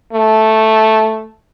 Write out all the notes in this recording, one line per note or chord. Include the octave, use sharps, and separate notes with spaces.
A3